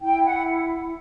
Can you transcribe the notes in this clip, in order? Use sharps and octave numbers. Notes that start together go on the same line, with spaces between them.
E4 G5
F#5